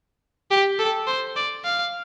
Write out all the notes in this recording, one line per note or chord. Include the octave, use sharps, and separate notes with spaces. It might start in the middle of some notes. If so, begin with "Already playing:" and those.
G4
A4
C5
D5
F5